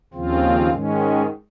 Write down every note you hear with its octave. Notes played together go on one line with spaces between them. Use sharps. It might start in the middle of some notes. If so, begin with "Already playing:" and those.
D#2 C#3 F3 C4 F4
G#2 D#3 G#3 C#4